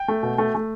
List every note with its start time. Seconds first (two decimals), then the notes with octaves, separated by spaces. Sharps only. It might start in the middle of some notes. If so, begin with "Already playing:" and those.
Already playing: G5
0.08 A3
0.23 B2
0.38 A3
0.55 A3